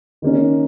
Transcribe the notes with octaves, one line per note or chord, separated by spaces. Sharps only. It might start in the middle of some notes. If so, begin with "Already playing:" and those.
D#3 A#3 C#4